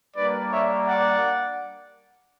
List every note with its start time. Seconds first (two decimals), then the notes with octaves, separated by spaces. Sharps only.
0.16 G3 A#3 D4 B4 D5
0.52 C#5 E5
0.88 D5 F#5